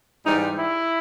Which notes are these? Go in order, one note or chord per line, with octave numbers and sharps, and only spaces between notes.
G#2 E3 G3 D#4
E4